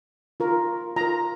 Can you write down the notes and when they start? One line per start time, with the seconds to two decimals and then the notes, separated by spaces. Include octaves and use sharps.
0.40 F4 A#4
0.96 F4 A#4 A#5